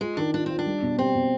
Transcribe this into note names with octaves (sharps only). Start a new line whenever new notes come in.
G#3 F4
D#3 D4
D4 F4
C4 F4
D4
G3
B2
C4 G4
B2